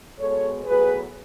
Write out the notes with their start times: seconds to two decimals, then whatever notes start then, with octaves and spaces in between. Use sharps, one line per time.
0.19 B2 G#3 B3 A4 C#5
0.64 A2 F#3 B3 G#4 B4